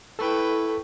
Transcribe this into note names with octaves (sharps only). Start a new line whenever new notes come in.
E4 A4 B4 G5 C#6 E6